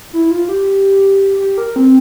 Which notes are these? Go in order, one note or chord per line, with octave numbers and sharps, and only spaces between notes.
E4
F4
G4
G4
A#4
C4